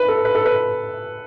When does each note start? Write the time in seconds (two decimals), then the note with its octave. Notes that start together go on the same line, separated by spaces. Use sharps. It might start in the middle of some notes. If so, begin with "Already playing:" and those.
Already playing: B4
0.08 A4
0.25 B4
0.35 A4
0.46 B4